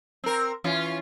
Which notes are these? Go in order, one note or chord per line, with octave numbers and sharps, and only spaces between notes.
C4 A#4
E3 C#4 F4